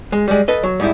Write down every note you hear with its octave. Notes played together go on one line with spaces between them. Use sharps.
G#3
G3 G#3
A4 B4 D#5
F#3
G#2 G3 D#4 E4